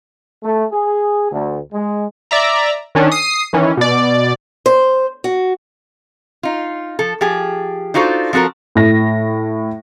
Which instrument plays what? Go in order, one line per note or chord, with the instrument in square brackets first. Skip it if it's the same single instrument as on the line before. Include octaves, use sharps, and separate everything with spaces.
[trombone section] A3
G#4
D2
G#3
[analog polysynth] D5 E5 A#5
D#3 C#4 D4
D#6 C7
D#3 E3 C#4
B2 D5
[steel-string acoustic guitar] C5
F#4
[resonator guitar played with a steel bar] D#4 F4
F3 A4
F3 G4 G#4
D4 D#4 F4 F#4 A4 C5
F3 C4 F#4 A4 A#4
[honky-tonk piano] A2 A#6